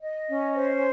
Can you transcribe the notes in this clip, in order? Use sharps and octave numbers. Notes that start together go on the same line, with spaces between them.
D#5
C#4
C5